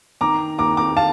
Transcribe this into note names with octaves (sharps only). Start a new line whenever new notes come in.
D#3 A#5 D6
D#2 A#5 D6
A#5 D6
F5 A5